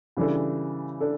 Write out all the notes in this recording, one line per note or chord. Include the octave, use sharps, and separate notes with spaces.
C#3 E3 G3 D4 A4
D4 A4